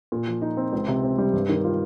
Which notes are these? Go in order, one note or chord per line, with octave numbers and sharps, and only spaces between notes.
A#2
F3
D#4
C4
C#2
C3
C4
G3
G2
D#3
F4